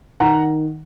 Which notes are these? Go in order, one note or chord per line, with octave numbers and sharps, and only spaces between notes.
D#3 F#5 A#5